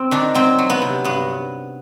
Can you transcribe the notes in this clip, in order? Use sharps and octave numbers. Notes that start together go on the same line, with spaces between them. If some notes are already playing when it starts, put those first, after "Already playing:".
Already playing: C4
D#3 D4
F#3 C4
F#3
B3
C3
G2 B3